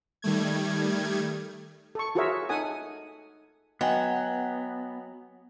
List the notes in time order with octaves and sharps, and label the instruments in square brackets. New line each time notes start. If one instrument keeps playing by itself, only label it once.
[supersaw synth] D#3 G3 A3 G#6
[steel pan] A4 C#6
F4 F#4 G#4 A#4 C#5 E5
D#4 A4 F#5 G#5 D#6
[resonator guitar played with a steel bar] F#3 [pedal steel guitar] B3 [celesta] D#5 G5 G#5